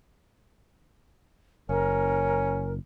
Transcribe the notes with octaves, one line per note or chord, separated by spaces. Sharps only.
F#1 C#4 A#4